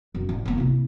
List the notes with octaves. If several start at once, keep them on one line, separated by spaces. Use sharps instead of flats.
F#2
A1
D3 A#3
C3 E4